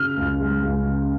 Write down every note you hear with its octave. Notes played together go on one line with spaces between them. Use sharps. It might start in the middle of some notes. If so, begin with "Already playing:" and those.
Already playing: C#3 F6
C#2
G#3
C#2
C#3